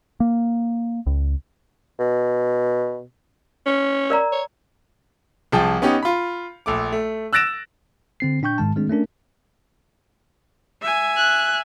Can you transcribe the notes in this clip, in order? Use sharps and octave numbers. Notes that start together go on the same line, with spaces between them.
A#3
C#2
B2
C#4
A#4 D5 A#5
C#5
C2 F3 G#4 G5 A5
B3 C#4 D#4 G4
F4 B5
A#1 A3 D6
A3
E6 F#6 A6 A#6 D7 E7
D3 C4 C7
A#2 D4 G5 C#6 G6
G#2 D#3 G#3 A5
D#3 G#3 A3 C4 D4 G#4
A3 C#4 D4 A#4
E5 G#5
F#6